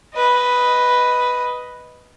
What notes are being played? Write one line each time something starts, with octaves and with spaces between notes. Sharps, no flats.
B4 D#5